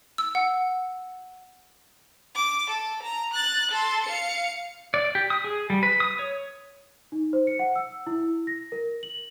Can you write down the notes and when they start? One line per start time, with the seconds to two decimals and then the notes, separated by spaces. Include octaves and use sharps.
0.18 E6
0.35 F#5
2.36 D6
2.70 A4
3.03 A#5
3.34 F#6 A6
3.72 A4 C6
4.04 F5 C#7
4.94 D5
5.15 G4
5.30 D#6
5.44 G#4
5.70 G3
5.83 B4
6.00 D#6
6.19 C#5
7.12 D#4
7.33 C5
7.47 C#7
7.59 F#5
7.76 E6
8.07 E4
8.47 A#6
8.72 A#4
9.03 F#7